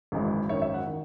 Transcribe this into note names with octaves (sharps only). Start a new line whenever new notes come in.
G#1 F#2 C#3 E3 G#3
G#1 F#2 D#3 C#5 E5
C#5 E5
F#5
D#3